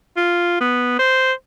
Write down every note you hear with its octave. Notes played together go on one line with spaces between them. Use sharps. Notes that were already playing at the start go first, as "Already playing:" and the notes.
F4
B3
C5